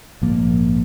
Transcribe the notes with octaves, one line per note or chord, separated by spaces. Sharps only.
A#1 G#2 F3 A#3